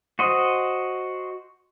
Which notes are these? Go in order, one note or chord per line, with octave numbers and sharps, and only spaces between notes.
F#4 C5 D#5